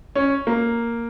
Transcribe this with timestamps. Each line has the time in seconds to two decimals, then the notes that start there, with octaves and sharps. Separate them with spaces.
0.15 C#4
0.47 A#3